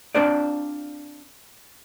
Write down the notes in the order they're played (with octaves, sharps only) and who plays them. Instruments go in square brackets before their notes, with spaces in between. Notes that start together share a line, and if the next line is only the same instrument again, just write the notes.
[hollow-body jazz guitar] C4 D4 F4 C5 D5